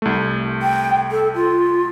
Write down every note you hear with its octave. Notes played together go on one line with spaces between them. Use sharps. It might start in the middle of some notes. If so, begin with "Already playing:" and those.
C2 A3
G5
A4
F4